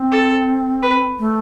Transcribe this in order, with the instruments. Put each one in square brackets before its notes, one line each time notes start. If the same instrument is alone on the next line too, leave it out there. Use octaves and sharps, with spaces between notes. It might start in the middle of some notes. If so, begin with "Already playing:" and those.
Already playing: [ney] C4
[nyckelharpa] A4
B4
[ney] A3